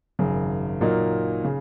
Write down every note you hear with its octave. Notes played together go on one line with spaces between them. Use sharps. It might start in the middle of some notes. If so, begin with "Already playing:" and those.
G#1 F#2 C#3
A#2 F#3 A#3 D#4
C#3